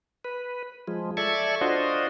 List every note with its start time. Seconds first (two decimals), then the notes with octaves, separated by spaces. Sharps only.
0.25 B4
0.88 F3 G#3
1.17 A4 D5 E5 C#6 G#6
1.61 D4 F4 F#4 C5 D#5